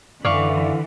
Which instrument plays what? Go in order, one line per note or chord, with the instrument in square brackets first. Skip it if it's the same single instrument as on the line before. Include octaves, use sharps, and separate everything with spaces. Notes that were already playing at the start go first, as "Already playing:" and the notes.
[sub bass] F#2 [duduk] D3 [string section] E3 [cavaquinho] D5 F5 C#6